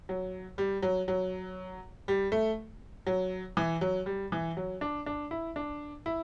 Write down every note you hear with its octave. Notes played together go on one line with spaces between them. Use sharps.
F#3
G3
F#3
F#3
G3
A3
F#3
E3
F#3
G3
E3
F#3
D4
D4
E4
D4
E4